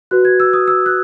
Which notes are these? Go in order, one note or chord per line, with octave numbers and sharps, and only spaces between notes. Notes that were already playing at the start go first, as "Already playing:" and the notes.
F#4 B4 F#6
G#6
E6
D#6
E6
F#6